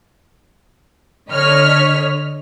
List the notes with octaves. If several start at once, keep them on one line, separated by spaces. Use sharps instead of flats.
D3 C#5 D#5 F6 B6